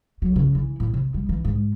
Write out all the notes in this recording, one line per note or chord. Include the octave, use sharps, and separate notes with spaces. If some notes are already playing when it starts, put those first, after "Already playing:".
F#3
C#3
E3
A2
C3
G3
E3
G#2